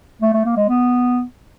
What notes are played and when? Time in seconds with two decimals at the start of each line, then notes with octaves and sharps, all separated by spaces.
0.22 A3
0.34 A3
0.45 A#3
0.57 G#3
0.69 B3